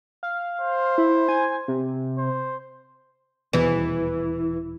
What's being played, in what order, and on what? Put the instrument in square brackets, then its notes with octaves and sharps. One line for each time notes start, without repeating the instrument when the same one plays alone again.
[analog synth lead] F5
[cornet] C5
[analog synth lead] E4
G#5
C3
[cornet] C5
[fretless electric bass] D#1 E2 B2 [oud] E3